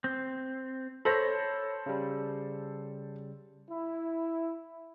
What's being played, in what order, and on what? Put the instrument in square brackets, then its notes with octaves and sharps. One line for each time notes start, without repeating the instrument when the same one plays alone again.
[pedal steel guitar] C4
[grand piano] A4 C5 A#6 [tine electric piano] C#5 B5
[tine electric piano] C#3 G3
[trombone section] E4